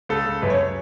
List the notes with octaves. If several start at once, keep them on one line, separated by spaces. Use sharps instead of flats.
C#2 A4
C#2
F#2 B4
C#5